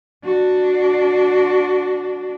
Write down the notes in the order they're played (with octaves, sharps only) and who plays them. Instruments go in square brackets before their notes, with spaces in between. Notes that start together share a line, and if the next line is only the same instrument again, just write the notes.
[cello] D4 F#4